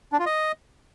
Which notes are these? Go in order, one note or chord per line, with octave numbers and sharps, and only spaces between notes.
D4
F4
D#5